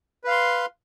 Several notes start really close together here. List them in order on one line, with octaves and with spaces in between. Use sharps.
B4 F5 C6